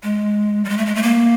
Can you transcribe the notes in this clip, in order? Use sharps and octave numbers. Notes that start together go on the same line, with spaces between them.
G#3
G3
G#3
A3
G#3
A3
A#3